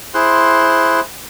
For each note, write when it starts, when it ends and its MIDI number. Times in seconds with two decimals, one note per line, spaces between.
0.14 1.00 64
0.14 1.00 68
0.14 1.00 72
0.14 1.00 84
0.14 1.00 90